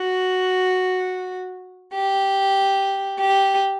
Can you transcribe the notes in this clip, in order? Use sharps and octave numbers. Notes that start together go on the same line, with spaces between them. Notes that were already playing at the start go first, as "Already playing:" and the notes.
Already playing: F#4
G4
G4